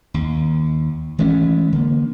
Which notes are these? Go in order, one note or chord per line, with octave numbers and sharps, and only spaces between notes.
D#2
E3 G#3 A3 C#4
D3 A#3